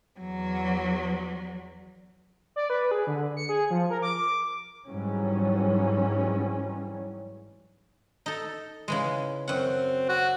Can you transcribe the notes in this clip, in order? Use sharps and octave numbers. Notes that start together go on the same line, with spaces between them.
E2 F#3
D5
B4
G#4
D3
C#7
G#4
F3
A#4
D6
G#2 E3 F#3 G3 C#4
D#4 A4
C#3 E3 G#3
F#2 C4 F#5
F#4